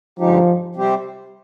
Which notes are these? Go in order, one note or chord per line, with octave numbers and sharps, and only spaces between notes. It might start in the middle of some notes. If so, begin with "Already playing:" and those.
G2 D3 F3 G#3 D#4 G4
C3 G3 C4 G4 C5